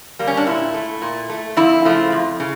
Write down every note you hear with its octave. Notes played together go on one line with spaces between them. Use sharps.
G3 A#3
C#4
D4
A#2 E4
A3
A#2
A3
F2 E4
C#3 F3 A3
F2
C#3